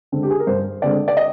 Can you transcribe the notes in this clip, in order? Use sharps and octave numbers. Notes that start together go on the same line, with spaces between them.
D3 G#3 C4
G4
G#4
A#4
G2 C5
D3 G#3 C4 D5
D5
D#5